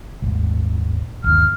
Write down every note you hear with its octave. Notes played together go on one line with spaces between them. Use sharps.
D#1 G#1
G1 D#2 F6